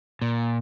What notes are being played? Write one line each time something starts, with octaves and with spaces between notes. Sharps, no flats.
A#2